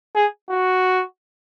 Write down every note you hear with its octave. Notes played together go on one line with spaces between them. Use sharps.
G#4
F#4